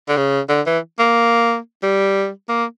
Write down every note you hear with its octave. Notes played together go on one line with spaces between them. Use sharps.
D3
C#3
D3
E3
A#3
G3
A#3